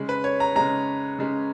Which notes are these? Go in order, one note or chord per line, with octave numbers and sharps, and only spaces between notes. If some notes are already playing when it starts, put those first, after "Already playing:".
Already playing: C#3 G#3
B4
C#5
A#5
C#3 G#3 A#5
C#3 G#3